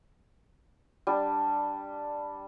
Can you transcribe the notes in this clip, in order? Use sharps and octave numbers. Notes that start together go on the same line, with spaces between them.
G3 D4